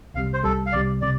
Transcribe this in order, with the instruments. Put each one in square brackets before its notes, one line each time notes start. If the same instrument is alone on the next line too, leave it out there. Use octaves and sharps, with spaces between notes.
[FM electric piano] C2 C3 G3 [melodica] F5
[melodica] C5
[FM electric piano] C2 C3 G3 [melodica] A4
[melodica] F5
[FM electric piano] C2 C3 G3 [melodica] D5
[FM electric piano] C3 [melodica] D5